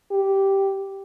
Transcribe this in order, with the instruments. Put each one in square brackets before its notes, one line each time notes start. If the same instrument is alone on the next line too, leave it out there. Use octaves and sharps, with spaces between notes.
[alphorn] G4